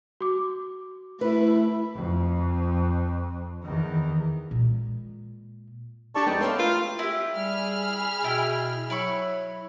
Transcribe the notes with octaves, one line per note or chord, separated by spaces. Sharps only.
F#4 D6
A3 E4 B4
F2
E2 D#3
A#2 G#3
D4 G4 A4 D5 A5 C#6
F2 G#3 B3 D#4 G5
A3 B4 C#5 F5 C6 E6
F4 A#4
E4 G4
G3 G#4 B5 F6
B2 E4 G5
F#3 E4 B5 C#6